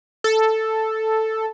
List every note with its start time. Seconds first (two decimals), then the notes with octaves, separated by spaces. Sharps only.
0.24 A4